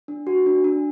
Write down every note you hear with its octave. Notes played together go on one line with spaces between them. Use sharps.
D4
F#4
D4
D4